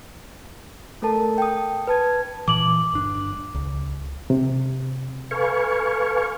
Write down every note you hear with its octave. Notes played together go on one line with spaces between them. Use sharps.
A3 A4 A#4 A5
G5 D#6
B4 A5 G#6
A#2 E3 D6 F#7
G1 D4
C#2
C3
A4 B4 F5 G#5 C#6